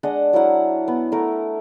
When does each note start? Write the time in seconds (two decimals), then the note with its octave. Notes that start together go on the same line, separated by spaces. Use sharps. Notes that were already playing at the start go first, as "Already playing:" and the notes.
0.03 G#3 D4 D#5 F#5
0.33 F#3 E4 A#4 F#5
0.88 B3
1.12 A3 E4 A#4